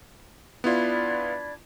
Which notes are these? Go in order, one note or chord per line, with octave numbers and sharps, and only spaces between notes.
B3 D4 E4 F4 B5 G#6